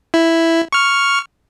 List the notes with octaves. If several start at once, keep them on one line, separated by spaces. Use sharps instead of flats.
E4
C#6 F6